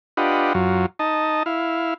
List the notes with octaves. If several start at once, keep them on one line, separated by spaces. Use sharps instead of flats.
D4 F4 G4 B4 D#5 F#5
F#2 F#3 F4
D#4 D#5 A5
E4 F5